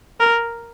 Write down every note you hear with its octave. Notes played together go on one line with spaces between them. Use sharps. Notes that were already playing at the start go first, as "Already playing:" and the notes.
A#4